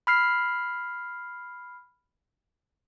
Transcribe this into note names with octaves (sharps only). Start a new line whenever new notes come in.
B5 F6 C7